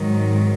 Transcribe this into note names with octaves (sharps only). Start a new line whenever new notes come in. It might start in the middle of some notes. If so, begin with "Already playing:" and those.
Already playing: G#1 G#2 D#3 F#3